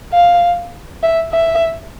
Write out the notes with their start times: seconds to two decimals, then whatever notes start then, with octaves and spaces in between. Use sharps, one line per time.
0.13 F5
1.03 E5
1.32 E5